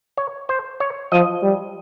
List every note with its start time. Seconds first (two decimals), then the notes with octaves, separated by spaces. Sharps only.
0.17 C#5
0.49 C5
0.80 C#5
1.12 F3 D#5
1.42 G3